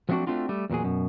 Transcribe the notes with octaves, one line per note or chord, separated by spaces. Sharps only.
F3 F#3 A3 C4 D4 F#4
A3 C4 D4 F4 F#4
G3 A3
E2 A#2 F#3 G#4
F#2 B2